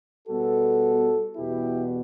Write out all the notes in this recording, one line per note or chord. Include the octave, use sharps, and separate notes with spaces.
B2 G3 B3 F#4 A4
E2 B2 G3 B3 E4 G4